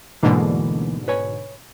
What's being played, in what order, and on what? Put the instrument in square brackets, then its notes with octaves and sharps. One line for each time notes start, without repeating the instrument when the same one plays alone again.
[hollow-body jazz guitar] D2 E3 A#3 [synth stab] G#2 B2 D3
[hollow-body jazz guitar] B4 C#5 G#5